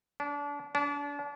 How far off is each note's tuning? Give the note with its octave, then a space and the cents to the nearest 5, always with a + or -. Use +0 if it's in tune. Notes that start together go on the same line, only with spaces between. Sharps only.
D4 -30
D4 -35